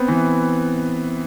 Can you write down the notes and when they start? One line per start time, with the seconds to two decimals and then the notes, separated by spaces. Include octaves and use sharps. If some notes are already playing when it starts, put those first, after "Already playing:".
Already playing: B3 C4
0.08 E3